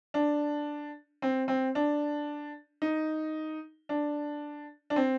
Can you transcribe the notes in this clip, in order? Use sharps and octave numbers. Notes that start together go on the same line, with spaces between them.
D4
C4
C4
D4
D#4
D4
D4
C4